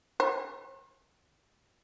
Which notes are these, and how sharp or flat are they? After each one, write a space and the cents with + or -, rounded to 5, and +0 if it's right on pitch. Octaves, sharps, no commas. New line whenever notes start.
C#5 -45